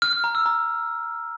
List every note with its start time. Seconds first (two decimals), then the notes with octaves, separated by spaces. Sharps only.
0.02 F6
0.13 F6
0.24 A#5
0.35 E6
0.46 A#5